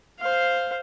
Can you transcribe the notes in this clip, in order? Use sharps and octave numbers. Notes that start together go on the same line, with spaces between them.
C5 F5